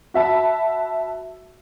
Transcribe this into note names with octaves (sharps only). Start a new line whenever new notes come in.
F#4 E5 A5 B5